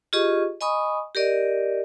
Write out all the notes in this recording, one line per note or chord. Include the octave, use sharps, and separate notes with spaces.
F4 G4 G#4 D#5 C#6
D#5 G#5 B5 C#6 D#6
G4 A#4 D5 D#5